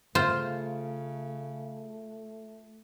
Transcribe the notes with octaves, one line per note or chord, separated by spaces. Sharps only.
C#3 A3 F4 C5